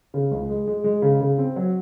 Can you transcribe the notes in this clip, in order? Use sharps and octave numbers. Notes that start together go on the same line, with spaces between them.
C#3
C#2
G#3
G#3
G#3
C#3
C#3
C4
F#3